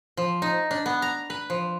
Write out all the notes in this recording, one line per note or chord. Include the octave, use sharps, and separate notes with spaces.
F3
D#4
D4
B3
A#5
B4
F3